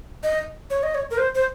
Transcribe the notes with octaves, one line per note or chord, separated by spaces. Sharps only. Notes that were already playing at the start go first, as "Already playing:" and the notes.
D#5
C#5
D#5
C#5
A#4
C5
C5